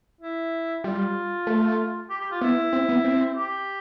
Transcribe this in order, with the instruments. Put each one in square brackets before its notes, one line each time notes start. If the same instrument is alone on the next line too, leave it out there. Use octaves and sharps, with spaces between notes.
[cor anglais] E4
[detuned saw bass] G3 [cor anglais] F4
[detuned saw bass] A3
[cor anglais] G4
G4
F4
[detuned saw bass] B3 [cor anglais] E4
[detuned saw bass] C4
B3
C4
[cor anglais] G4